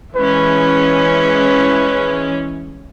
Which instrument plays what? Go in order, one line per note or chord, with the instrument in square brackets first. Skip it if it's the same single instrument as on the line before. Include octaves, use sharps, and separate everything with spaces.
[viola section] E3 G#3 C#4 [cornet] B4